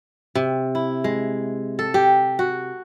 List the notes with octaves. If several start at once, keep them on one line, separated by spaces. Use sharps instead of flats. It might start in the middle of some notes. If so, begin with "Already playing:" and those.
C3
E4
G#3
A4
G4
F#4